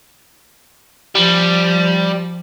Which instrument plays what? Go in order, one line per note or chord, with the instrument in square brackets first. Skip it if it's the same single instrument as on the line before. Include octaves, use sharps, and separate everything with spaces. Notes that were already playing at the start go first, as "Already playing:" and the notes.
[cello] F3 [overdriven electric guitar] G3